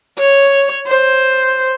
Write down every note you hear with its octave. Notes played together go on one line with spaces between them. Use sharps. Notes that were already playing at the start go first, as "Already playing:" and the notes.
C#5
C5